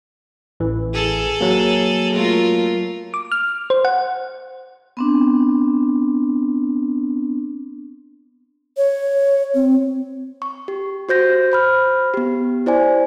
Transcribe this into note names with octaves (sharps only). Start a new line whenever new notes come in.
A1 E3
G#4 A4
F#3 A#3
A3 F4 A#4
D6
F6
C5
F#5
B3 C4 D4
C#5
C4
C#6
G4
F#4 C5 G6 A#6
C5 B5 F6
B3 G4
E4 C5 D5 G#5